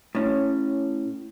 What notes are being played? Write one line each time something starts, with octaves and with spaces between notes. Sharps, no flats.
A2 C#4